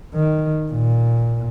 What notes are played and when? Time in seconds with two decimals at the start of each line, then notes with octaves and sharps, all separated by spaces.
0.15 D#3
0.72 A#2